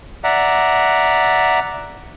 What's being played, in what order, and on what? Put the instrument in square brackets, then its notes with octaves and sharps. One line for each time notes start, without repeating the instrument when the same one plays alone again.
[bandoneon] D5 E5 F#5 A#5